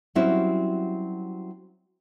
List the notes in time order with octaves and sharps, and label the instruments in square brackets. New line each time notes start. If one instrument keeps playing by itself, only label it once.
[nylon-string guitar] F#3 G3 C4 C#4 E4 F#4